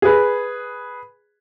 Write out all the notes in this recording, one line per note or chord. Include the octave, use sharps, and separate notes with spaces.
G#4 B4